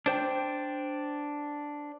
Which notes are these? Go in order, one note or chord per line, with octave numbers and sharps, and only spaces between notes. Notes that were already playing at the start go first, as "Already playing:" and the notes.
D4 C5 G5